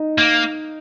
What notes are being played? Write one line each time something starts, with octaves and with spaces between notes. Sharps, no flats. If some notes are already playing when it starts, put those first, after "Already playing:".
Already playing: D#4
A#3